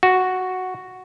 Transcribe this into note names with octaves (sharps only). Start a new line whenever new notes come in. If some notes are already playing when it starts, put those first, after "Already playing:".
F#4